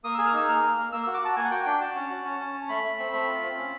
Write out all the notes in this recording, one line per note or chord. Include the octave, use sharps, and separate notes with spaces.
A#3 D#6
G#4 E6
F6
D#4 E6
A#3 F6
A#3
A#3
A#3 E6
F#4 E6
D6
F#4 A5
A#3 G#5
F#5
F#4 G5
D4 G5
F#4 A5
C#4
F#4
C#4
C#4
C#4
A3 B5
A3
C4
A3 B5
F4
C4
C#4